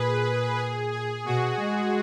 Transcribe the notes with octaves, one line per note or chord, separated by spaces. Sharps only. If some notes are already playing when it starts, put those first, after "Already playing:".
Already playing: A#2 G#4 B4
G#4
G#4
B2 F#4
G#3